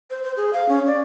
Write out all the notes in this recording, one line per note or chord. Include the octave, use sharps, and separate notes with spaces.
C5
C5
G#4
F5
C#4
D5